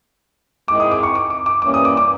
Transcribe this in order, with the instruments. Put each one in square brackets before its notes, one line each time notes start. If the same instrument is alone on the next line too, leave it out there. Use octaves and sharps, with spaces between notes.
[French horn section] G#2 D#3 G#3 C4 E4 [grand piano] D6
[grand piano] D#6
D6
C#6
D6
D6
D6
[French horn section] E3 G3 A#3 C#4 [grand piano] D6
[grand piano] D#6
D6
D6